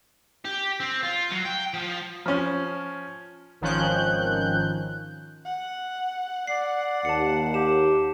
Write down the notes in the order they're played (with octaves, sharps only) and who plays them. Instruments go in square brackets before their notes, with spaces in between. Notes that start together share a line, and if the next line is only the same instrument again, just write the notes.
[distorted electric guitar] G4
C4
F4
F#3
G5
F3
[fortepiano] F3 C#4
[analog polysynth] G#1 D#3 F3 C#4 F#6 G6
[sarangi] F#5
[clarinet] D5 [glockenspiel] C7
[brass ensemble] D#2 [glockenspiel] A5 C#7
[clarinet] G4 [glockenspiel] E7